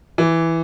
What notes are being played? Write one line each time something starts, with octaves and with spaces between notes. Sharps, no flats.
E3